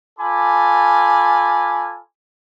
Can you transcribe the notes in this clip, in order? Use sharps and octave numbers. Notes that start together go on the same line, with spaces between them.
F4 A4 G#5 B5 D6